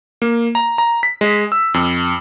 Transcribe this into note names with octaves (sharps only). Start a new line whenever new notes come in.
A#3
A#5
A#5
B6
G#3
E6
F2